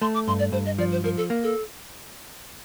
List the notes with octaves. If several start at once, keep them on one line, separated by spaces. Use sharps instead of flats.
A3 C6
D6
G2 C6
D5
G2 C5
D#5
F3 D5
C5
F3 A#4
A4
A#3
A4